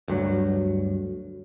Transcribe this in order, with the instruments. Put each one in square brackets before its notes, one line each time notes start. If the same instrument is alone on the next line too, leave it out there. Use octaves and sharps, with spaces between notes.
[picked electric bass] D2 G2 F#3